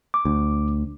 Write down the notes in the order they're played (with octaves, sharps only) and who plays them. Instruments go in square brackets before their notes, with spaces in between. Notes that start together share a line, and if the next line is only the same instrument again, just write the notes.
[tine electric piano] D6
[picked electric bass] D2